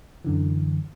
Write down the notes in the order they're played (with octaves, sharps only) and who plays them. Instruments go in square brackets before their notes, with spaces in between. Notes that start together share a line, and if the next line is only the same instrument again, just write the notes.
[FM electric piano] F#2 D3 E3